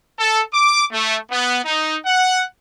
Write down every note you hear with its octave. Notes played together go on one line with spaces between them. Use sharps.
A4
D6
A3
B3
D#4
F#5